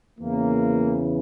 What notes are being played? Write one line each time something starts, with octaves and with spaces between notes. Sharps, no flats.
E2 C#3 E3 A#3